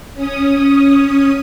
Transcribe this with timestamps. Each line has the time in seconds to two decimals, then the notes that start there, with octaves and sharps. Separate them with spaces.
0.14 C#4 D#6